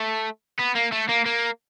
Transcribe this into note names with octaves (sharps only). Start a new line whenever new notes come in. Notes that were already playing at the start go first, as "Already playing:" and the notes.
Already playing: A3
B3
A#3
A3
A#3
A#3